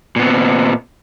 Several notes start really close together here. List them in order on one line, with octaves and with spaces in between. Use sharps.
A#2 B3 C4